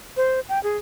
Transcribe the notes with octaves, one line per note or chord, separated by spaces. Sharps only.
C5
G5
G#4